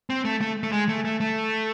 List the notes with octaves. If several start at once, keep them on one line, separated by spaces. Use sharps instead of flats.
C4
A3
A3
A3
G#3
A3
A3
A3